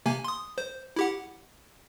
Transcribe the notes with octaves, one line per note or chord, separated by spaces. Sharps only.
C3 A#3 G#5
C6 D#6
C5
E4 G4 F#5